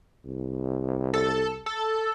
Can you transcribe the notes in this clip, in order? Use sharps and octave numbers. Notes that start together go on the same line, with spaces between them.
C2
A4
A4